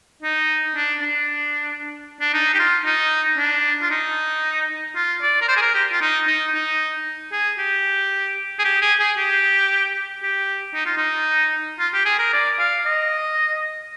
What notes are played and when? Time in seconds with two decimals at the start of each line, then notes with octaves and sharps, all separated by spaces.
0.23 D#4
0.76 D4
1.01 D4
2.21 D4
2.34 D#4
2.54 G4
2.59 F4
2.85 D#4
3.38 D4
3.82 F4
3.91 D#4
4.96 F4
5.22 D5
5.42 A#4
5.48 C5
5.57 G#4
5.62 A#4
5.74 G4
5.93 F4
6.01 D#4
6.27 D#4
6.54 D#4
7.32 G#4
7.59 G4
8.59 G#4
8.65 G4
8.82 G#4
9.00 G#4
9.17 G4
10.23 G4
10.74 D#4
10.86 F4
10.97 D#4
11.79 F4
11.94 G4
12.06 G#4
12.19 A#4
12.33 D5
12.59 F5
12.86 D#5